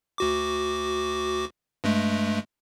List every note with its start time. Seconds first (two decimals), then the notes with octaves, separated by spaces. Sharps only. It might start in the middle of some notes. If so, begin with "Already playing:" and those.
0.18 D2 F#4 D6
1.84 G2 G#3 A3